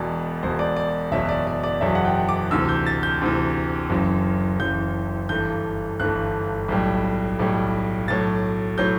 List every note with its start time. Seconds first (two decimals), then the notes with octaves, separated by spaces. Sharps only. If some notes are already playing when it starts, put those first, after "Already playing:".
Already playing: E1 E2 B2 D5
0.43 E1 E2 B2 C5
0.59 D5
0.76 D5
1.12 F#1 E2 B2 F#3 E5
1.29 D5
1.47 D5
1.64 D5
1.81 F#1 E2 B2 F#3 E5
1.95 F#5
2.05 G5
2.29 D6
2.51 D2 C3 E3 E6
2.69 G6
2.86 A6
3.03 G6
3.21 D2 C3 E3
3.90 F#1 F#2 E3
4.59 F#1 F#2 E3 G6
5.29 G1 G2 E3 A3 G6
6.00 G1 G2 E3 A3 F#6
6.68 B1 A2 G3
7.39 B1 A2 G3
8.08 B1 A2 F#3 A6
8.78 A2 F#3 G6